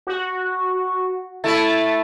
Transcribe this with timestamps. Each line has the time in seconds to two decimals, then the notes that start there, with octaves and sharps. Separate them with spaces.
0.07 F#4
1.44 A3 E4 A5 A6